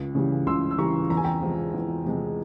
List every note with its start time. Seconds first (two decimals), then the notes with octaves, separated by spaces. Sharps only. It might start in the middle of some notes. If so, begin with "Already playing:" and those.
Already playing: C#2
0.15 C#3 E3 G3
0.47 C#2 C6 E6
0.71 E6
0.78 C#3 E3 G3 A#5 C#6
1.10 E2 A#5
1.17 G#5
1.24 G5 A#5
1.42 C3 F3 G#3
1.74 E2
2.06 C3 F3 G#3